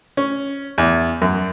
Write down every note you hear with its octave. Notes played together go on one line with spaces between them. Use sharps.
C#4
E2
F#2